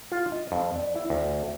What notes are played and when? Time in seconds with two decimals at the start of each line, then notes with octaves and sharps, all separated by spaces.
0.12 F4
0.32 D#5
0.52 F2
0.76 D5
0.95 E4
1.10 D2